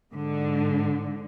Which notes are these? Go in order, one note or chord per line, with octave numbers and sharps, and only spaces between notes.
G#2 D3